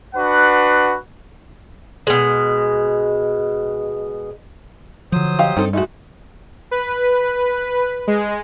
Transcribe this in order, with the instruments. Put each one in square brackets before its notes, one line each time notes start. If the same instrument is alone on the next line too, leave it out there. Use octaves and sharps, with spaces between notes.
[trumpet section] D4 F#4 B4 F#5
[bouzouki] B2 G#3
[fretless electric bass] D3 F3 [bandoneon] F#3 C5 D#6
[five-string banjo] G4 D#5 F5
[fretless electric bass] G2 [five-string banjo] C4 D#4 A4
[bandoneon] G#3 A3 [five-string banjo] D#4 F#4
[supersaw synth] B4
G#3